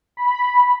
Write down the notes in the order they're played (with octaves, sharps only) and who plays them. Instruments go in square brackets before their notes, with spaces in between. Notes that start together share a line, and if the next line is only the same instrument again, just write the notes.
[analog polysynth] B5